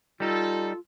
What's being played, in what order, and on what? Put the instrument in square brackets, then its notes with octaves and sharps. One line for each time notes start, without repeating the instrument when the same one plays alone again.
[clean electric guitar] G3 D#4 [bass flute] F4 [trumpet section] A4